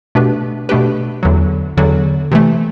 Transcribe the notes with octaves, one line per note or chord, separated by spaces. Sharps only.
B2 A3 D4 G4 B4
B2 A3 D4 G4 B4
E2 D3 F#3
E2 D3 F#3
C3 E3 A3